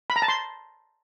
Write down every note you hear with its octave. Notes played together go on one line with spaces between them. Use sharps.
B5
A#5
A5
C6